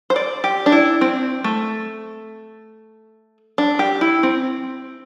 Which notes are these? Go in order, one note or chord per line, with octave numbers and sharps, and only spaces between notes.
C5
D5
G4
D4
E4
C4
A3
D4
G4
E4
C4